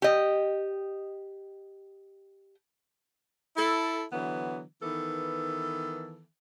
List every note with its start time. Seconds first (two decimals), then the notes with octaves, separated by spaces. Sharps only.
0.02 G4 D#5
3.56 E4 A4
4.12 D3 E3 F#3 B3
4.82 D#3 E3 B3 A4